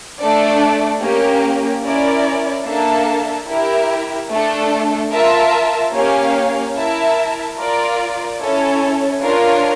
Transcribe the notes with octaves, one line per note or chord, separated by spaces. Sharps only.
A3 D4 A4 D5
A#3 C#4 G4
C#4 E4 A#4 D5
A#3 D4 A4 E5 A5
E4 G4 A#4 E5
A3 D4 A4
F4 A#4 E5 A5
A#3 C#4 G4 C#5 F5
E4 A#4 E5 A5
F4 A#4 D5
C#4 E4 A4 C#5
D4 F4 A#4 C#5